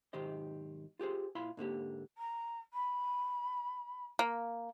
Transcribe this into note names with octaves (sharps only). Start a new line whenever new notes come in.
B1 G#2 D#3 G4 C5 D#5
F4 G4 G#4 C5
A#2 E4 F5 B5 C6
G#2 D3 A#3 G4
A#5
B5
A#3